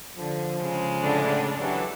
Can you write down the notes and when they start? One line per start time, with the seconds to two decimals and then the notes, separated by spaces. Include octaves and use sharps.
0.17 D3 F3
0.61 C#3 G#3
1.01 A2 D3 D4
1.60 E3 F#3 G4 A4